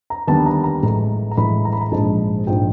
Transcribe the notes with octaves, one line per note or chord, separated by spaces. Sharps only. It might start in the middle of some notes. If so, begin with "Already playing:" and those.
A#5
D#2 D3 G3 B3 A5
A#5
A#5
A1 A2 E3 G#3 A#5
A#5
A1 A2 E3 G#3 B5
A#5
B5
A#5
A#1 G#2 F3 G#3 A5
A#1 G#2 F3 G#3 G5